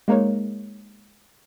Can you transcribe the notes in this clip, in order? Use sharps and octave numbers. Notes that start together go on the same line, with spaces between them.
G#3 A#3 D#4 A#4 C#5